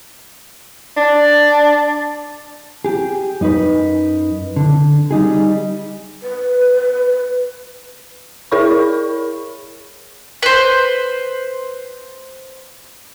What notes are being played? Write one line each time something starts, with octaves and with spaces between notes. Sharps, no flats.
D4
G4 G#4
F#2 D#4 E4 B4
D3
G3 D#4 G#4
B4
E4 G#4 A#4 C#5 B5 C#6
B4 C5